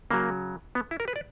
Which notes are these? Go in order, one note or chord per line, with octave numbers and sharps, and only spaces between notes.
C#3 F#3 A#3
B3
E4
A#4
B4
D5